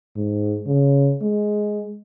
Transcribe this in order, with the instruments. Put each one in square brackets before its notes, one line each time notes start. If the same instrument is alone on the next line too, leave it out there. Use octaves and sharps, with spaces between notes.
[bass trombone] G#2
C#3
G#3